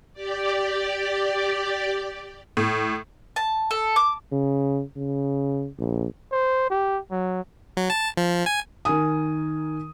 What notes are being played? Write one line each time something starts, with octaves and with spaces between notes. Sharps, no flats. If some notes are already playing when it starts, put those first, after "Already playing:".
G4 D5
A2
A5
A4
D6
C#3
C#3
A#1
C5
G4
F#3
F#3
A5
F3
G#5
D#3 A#4 G#5 D#6